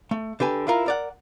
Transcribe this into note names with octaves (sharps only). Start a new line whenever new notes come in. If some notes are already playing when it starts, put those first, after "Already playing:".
A3
D3 G4 B4 G#5
E4 F4 A#4
A#4 D5 F#5